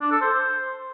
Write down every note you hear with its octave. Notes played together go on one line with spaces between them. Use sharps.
D4
A4
C5